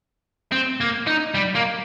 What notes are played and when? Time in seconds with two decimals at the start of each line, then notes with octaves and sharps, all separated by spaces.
0.52 C4
0.81 A#3
1.07 D#4
1.35 G3
1.55 A#3